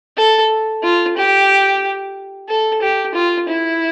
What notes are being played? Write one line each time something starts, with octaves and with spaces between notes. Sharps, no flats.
A4
F4
G4
A4
G4
F4
E4